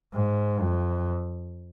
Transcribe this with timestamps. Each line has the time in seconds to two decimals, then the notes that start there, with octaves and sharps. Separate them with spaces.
0.14 G#2
0.61 F2